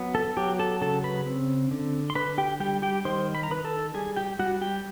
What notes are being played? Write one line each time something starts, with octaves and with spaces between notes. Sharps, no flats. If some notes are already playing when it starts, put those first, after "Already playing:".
Already playing: F#3 B3
A4 A5
F#3 G4 G5
A4 A5
C#3 A4 A5
B4 B5
C4
D3
C6
D3 B4 B5
G4 G5
G3 G4 G5
G4 G5
D#3 C5 C6
B5
A#5
D#3 B4 B5
A4 A5
G3 G#4 G#5
G4 G5
G3 F#4 F#5
G4 G5